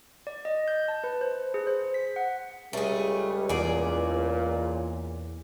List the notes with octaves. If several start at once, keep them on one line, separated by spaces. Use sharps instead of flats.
D5
D#5
G6
A5
B4
C5
G#4
C5
B6
F#5
C#2 G3 A3 G#4
E2 A#2 G#4 D5